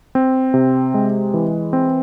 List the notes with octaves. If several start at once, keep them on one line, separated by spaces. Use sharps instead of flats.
C4
C3
G#3
E3
C4